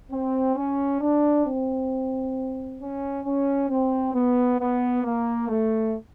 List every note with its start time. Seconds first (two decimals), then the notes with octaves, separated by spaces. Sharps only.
0.10 C4
0.55 C#4
1.00 D4
1.45 C4
2.79 C#4
3.24 C#4
3.69 C4
4.13 B3
4.58 B3
5.03 A#3
5.48 A3